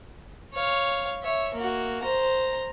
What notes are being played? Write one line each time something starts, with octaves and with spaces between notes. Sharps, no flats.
C#5 F5
C#5 E5
A#3 F#4
C5 A#5